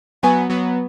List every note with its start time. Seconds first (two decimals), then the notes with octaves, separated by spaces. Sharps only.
0.23 F#3 B3 E4 B4 G#5 C#6
0.50 F#3 B3